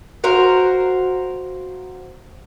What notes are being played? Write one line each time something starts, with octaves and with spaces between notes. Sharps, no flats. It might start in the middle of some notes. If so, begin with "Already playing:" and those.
F#4 A#4 C5 F5